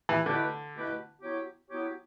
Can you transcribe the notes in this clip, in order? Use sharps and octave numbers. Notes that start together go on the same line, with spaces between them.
E3
B2 D3 A3 E4 G4 B4
B2 A3 E4 G4 B4
F#3 B3 E4 G4 C#5
F#3 B3 E4 G4 C#5